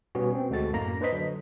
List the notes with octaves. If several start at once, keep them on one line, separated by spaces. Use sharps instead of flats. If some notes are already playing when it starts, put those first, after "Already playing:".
B2 G3 B3 C#4 F#4
C4
D2 G#3 F#4 A4 A6
F#2 A2 A#3 A#5 A#6
D4 B4 C5 D#5 B6
D3 F#3